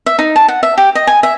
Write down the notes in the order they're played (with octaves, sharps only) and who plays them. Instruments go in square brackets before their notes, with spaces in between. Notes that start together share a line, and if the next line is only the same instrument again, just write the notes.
[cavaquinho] E5
D#4
A5
F#5
E5
G4
D#5
G#5
E5